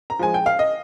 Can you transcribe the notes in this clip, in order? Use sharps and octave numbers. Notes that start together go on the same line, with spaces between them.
A#5
F3 G#3 G#5
G5
F5
D#5